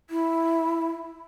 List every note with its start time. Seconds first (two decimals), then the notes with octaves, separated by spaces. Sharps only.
0.10 E4